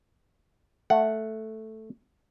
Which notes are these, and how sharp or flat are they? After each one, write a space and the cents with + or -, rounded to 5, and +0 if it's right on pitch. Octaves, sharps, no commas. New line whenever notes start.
A3 +0 F#5 +0